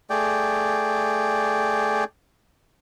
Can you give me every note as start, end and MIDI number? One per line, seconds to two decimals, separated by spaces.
0.10 2.04 57
0.10 2.04 68
0.10 2.04 74
0.10 2.04 79